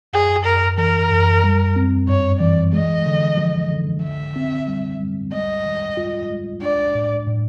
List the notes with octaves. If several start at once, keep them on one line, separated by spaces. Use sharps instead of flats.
F#2 G#4
F#2 A#4
E3 A#4
F#2
G3
C4
G2 C#5
E3 D5
G#3 D#5
D3
F3
D3
D3 E5
C4
G3
G3
G#3 D#5
D#3
F4
G#3
D4 D5
A2
A2